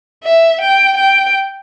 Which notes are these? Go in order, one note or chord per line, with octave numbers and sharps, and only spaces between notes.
E5
G5
G5